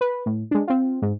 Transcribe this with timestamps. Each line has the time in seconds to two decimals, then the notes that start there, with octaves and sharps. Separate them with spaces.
0.01 B4
0.26 A2
0.51 G#3 D4
0.68 C4 F4
1.02 G#2